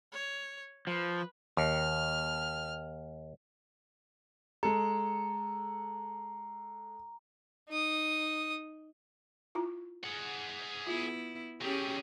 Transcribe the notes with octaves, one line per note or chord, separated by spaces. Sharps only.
C#5
F3 B4
D#2 F6
G#3 A4 A#5
D#4 D#6
E4 F4 A#5
G#4 F#5
B3 E4 F4
F#3 G3 C#4 G4 G#4